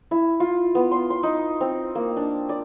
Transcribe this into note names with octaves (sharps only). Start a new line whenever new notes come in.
E4
F4
B3
C6
C6
D#4
C4
A#3
D4
D5